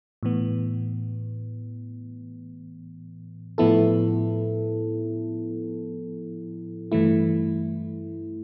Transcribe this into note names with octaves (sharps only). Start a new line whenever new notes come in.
A2 E3 B3
A2 F3 B3 E4 A4
G2 E3 A3 E4